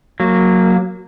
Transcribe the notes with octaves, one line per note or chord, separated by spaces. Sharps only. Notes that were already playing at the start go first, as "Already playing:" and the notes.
F#3 A#3